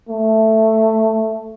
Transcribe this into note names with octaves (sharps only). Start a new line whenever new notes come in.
A3